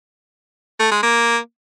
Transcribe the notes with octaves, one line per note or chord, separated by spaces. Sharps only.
A3
G#3
A#3